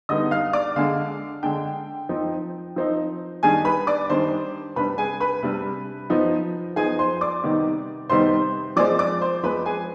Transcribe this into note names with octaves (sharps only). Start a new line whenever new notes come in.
D3 G3 B3 D#4 D#5 D#6
F5 F6
D5 D6
D3 G#3 D4 F5
D3 G#3 D4 G5
F3 C4 D#4
F3 C4 D#4
D#3 G3 D4 G#4 G#5
B4 B5
D5 D6
D#3 G3 D4 C5 C6
C3 G3 D4 B4 B5
G#4 G#5
B4 B5
C3 G3 D4
F3 B3 D#4
F3 B3 D#4 G#4 G#5
C5 C6
D5 D6
C3 D#3 G3 B3 D#4
C3 D#3 G3 B3 D#4 C5 C6
F3 G#3 C4 D5 D6
D5 D6
C5 C6
F3 G#3 C4 B4 B5
G#4 G#5